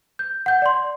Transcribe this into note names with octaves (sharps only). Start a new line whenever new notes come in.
G6
F#5 G6
D5 C6